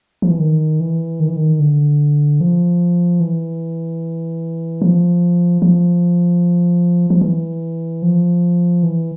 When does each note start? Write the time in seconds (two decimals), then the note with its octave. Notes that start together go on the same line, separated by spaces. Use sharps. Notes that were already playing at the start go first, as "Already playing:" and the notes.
0.22 F3
0.30 E3
0.40 D#3
0.80 E3
1.20 D#3
1.28 E3
1.36 D#3
1.60 D3
2.41 F3
3.20 E3
4.82 F3
5.62 F3
7.10 F3
7.21 E3
8.02 F3
8.83 E3